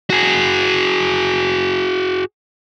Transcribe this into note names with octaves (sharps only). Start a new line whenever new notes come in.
F#4 G#4